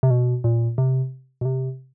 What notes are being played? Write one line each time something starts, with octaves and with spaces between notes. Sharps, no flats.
C3
B2
A#2
C3
B2
C3